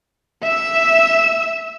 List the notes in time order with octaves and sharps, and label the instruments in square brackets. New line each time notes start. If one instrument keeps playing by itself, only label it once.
[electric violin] E5 E6